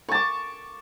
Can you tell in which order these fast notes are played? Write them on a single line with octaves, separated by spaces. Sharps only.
C#6 A5 D6